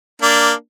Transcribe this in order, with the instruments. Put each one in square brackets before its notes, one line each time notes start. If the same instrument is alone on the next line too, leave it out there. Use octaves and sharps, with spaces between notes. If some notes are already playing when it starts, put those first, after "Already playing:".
[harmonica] A#3 D4